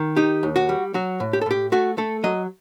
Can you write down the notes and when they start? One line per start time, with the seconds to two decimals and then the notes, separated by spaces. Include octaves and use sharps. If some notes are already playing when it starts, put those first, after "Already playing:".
Already playing: D#3
0.16 D#4 G4
0.43 D#2
0.56 F#4
0.69 G3
0.94 F#3 F#4
1.20 A2
1.33 G4
1.41 A4
1.46 A2 G4
1.72 A3 F#4
1.98 A3 A4
2.24 F#3 D#5